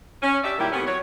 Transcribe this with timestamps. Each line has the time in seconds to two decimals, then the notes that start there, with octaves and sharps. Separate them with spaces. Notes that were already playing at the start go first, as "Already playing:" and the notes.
0.22 C#4
0.43 D4 G4 D5 E5
0.58 A#2 D#3 F#3 G3 E4 G4
0.72 A2 C3 B3 C#4
0.85 F#3 C#5